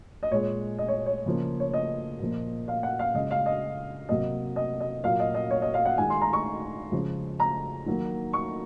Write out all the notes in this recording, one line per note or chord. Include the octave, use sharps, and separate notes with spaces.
D#5
A#2 G#3 C#5
D#5
C#5
C#5
C#3 F3 A#3
C#5
D#5
A#2 F3 A#3
F5
F#5
F5
C#3 G#3 D#5
F5
D#5
C3 F#3 A#3 D#5
D#5
D#5
A#2 F#3 A#3 F5
D#5
D#5
C#5
D#5
F5
F#5
D#3 G#3 G#5
C6
A#5
C#6
C#3 F3 G#3
A#5
D#3 F#3 A#3
C#6